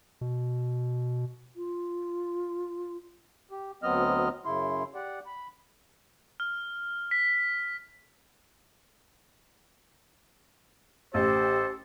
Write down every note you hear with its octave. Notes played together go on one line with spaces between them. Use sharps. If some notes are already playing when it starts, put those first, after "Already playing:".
B2
F4
G4
D2 F#3 B3 C4 D#5 F6
F#2 C#3 E4 C6
G4 D5 F#5
B5
F6
B6
A1 G4 A4 C5